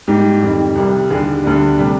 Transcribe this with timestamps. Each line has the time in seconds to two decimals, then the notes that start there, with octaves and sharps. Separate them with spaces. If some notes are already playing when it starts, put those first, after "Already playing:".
0.08 G#2 G3 G4
0.42 F2 D#3 G3
0.76 C2 C3 G3
1.10 D#2 D3 G3 G#4
1.44 D2 D3 G3
1.78 C3 G3